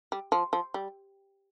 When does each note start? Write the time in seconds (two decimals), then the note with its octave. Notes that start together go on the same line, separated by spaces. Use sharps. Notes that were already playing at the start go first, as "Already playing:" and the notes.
0.12 G3
0.32 F3
0.53 F3
0.74 G3